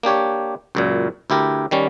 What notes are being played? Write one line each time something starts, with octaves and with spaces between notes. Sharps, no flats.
A#3 D4 G4 C#5
C#2 F#2 A#2
D2 E4 G4 A#4
D#3 G3 C#4